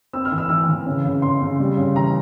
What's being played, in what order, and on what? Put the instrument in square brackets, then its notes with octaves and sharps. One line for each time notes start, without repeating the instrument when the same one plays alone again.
[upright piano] C4 E6
F6
E3
E6
E3 E6
E3
C#3
C#3
C#3 C6
C#3
G3
C#3
E3 A#5